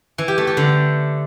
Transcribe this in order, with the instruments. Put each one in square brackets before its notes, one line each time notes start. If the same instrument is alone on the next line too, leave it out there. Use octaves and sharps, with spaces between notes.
[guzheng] E3
G4
A3
G4
D3